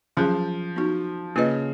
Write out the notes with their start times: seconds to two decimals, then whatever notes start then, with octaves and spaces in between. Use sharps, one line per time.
0.17 F3 F#3 C#4 G#4
0.76 B3 D#4 F#4
1.36 C#3 A#3 F4 B4 D#5